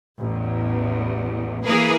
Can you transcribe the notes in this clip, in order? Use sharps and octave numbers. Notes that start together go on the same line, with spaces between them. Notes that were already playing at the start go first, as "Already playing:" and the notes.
A1 E2
E3 A#3 G#4 A#4 B4